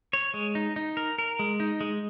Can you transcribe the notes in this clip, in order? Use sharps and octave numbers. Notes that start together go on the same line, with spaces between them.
C#5
G#3
D#4
D#4
A#4
A#4
G#3
D#4
G#3